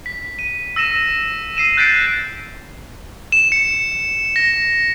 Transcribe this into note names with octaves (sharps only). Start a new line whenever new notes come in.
B6
D#7
E6 A#6 D#7 E7
E6 C7 D#7 E7
F#6 G6 A6 B6 C7 D7
E7
C#7
A#6